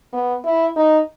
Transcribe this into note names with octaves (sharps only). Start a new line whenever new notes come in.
B3
E4
D#4